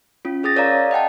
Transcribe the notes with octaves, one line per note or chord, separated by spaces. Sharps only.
C#4 F4
C#4 G#4 D#6 A6 A#6
A#4 C#5 D5 F5 A#5
D#5 F#5 G5 A5